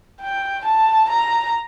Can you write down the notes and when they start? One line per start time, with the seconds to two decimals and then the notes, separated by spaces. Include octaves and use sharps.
0.21 G5
0.65 A5
1.10 A#5